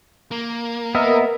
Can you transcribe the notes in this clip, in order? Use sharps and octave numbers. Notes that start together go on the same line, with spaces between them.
A#3
B3 A#4 D#5 E5